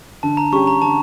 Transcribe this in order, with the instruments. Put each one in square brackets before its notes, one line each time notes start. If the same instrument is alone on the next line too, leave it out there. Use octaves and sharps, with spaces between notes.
[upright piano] D3 [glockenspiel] A5
[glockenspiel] A#5
[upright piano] G3 C#4 G4 [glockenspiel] C#6
[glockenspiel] A#5
[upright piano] D3 [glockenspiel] A5